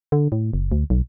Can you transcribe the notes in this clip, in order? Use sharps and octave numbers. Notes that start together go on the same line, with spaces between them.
D3
A2
F#1
D2
B1